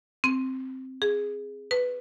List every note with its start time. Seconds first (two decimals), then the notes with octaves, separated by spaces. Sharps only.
0.24 C4
1.02 G#4
1.71 B4